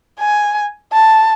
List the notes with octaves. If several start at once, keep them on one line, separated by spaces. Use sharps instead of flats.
G#5
A5